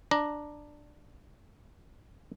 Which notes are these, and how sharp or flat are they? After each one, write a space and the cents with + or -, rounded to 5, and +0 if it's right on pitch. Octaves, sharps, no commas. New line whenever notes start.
D4 +10 A#5 +5